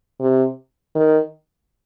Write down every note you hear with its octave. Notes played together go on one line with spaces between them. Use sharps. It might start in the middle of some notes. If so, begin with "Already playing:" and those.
C3
D#3